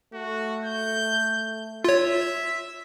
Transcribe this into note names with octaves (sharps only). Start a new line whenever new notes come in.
A3 F#4
G6
F4 C#5 E5